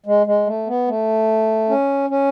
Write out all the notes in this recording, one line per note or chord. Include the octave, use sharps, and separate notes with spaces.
G#3
G#3
A3
B3
A3
C#4
C#4